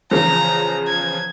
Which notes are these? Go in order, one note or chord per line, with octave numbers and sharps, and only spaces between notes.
E2 C#3 F3 A#5
G#6